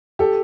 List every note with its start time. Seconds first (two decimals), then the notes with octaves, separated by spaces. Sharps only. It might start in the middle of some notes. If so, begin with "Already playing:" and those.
0.19 G4 A4